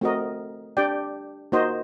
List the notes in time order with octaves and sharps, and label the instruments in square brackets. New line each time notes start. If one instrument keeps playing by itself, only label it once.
[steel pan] A3 C4 F#4 A#4 D#5
D4 G4 D5 G5
A#3 D#4 F#4 C5 D#5